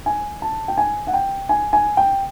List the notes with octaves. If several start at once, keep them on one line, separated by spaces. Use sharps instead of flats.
G#5
A5
G5
G#5
F#5
G5
G#5
G#5
G5